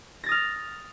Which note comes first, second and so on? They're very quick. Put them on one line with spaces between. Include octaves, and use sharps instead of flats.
A#6 A6 D#6 F6